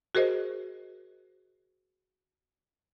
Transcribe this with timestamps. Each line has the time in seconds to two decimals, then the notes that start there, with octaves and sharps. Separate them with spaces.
0.15 F#4 G#4 A#4 C5 D#5